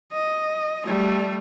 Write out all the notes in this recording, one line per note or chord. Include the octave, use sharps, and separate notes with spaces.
D#5
G3 A3